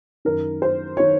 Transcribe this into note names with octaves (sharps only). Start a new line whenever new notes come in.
F#2 D#3 A#4
C5
D#3 C#5